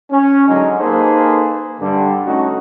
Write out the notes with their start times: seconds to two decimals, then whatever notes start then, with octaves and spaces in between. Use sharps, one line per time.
0.11 C#4
0.48 D3 F#3 G#3 D#4
0.79 A#3 D#4 G#4 A4 B4 C5
1.80 G2 D3 D4
2.25 A3 C#4 D#4 F#4